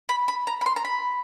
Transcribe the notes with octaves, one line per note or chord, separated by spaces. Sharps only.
B5
B5
A#5
B5
C6
A#5
B5